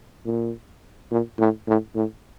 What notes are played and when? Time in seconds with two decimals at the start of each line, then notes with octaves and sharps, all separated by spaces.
0.26 A#2
1.11 A#2
1.39 A2
1.68 A2
1.95 A2